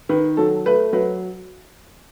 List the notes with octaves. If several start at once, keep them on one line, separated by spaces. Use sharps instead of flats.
D#3 B4
F#3 A4
A3 B4
F#3 B4